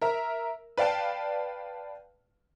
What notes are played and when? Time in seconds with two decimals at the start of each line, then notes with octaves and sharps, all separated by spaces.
0.02 A#4 E5 A#5
0.77 B4 D5 F5 G5 A5